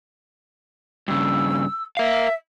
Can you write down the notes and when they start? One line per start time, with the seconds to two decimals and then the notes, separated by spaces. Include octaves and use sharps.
1.08 G2 C#3 E6
1.97 A#4 E5 F5